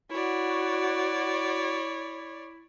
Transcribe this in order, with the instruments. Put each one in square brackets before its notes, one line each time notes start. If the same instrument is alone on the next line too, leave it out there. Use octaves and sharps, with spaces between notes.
[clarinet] E4 [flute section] F#4 [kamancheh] C#5 D5